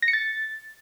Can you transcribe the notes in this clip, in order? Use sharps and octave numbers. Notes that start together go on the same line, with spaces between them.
A#6
C#7
A6